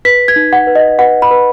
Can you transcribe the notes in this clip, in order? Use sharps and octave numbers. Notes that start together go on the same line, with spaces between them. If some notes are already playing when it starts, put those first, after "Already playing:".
B4 B6
G#6
D#4
F#5
B4
D#5
B4 F#5
B5
B4